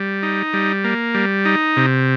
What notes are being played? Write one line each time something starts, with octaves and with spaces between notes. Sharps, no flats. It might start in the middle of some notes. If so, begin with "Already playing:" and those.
Already playing: G3
D#4
G3
A#3
G3
D#4
C3